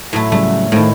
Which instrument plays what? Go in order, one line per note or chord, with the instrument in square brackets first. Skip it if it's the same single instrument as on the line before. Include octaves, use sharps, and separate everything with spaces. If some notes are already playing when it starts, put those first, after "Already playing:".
[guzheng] A2 F#3 A3
[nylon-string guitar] C#3 F#3 G3 [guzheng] A3
[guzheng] A2 D#3 [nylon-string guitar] A3 C5 F5